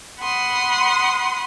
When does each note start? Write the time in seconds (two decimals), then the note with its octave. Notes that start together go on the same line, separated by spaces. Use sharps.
0.20 F#5 B5 C6 D#6